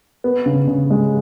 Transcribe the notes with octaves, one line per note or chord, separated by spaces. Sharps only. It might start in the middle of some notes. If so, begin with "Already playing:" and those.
B3
C#3
C#3
G#3